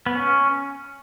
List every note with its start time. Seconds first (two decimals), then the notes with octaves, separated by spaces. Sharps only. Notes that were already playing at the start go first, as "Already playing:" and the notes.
0.06 B3
0.15 C#4